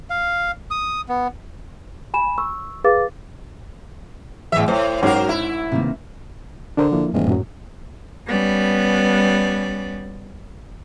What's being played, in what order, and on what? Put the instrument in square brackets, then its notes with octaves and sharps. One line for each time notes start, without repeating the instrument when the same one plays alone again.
[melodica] F5
D#6
B3
[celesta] G#5 B5 E7
C#6 E6
G#4 B4 F5 D6 A6
[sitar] E2 E5 [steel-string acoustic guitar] A2 E3
[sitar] A2 [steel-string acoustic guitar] C5 C#5
[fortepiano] G#2 C#4 F#4 [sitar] F#3 A#4
[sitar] E4
[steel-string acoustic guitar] C3 D#3 A#3
[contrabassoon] D3 [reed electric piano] D4 A#4 C5
[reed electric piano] F3 A#3 E4
[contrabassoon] D#1 [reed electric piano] G2 E3 G#3
[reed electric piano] F#2 A2 F#3
[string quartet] G3 B3 C#4 D5